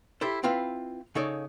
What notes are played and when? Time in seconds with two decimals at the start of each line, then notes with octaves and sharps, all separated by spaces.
0.21 E4 G4 A4 C5
0.43 C4 E4 F4 B4 F5
1.15 C#3 D#4 A4 C#5 D5